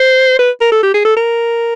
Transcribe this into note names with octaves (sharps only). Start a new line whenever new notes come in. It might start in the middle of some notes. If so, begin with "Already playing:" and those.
Already playing: C5
B4
A#4
A4
G4
G#4
A4
A#4